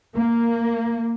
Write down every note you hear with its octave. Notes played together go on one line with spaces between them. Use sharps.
A#3